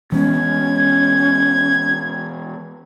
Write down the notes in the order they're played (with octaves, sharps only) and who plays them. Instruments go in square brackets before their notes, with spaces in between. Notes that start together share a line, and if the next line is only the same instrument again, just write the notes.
[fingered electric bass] E3 G#3 B3 [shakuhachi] C#4 [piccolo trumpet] G#6